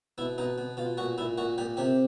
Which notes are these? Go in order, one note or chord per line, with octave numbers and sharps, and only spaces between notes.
B2 E4
B2 D#4
B2
B2 F4
A#2 F#4
A#2 E4
A#2 F#4
A#2 G4
C3 G4